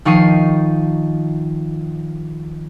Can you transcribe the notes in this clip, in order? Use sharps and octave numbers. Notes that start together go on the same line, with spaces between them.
D#3 F3 D#4 C#6 D#6 C7